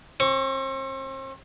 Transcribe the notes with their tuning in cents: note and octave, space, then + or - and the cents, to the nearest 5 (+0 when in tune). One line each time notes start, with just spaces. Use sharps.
C4 +40 C#6 +0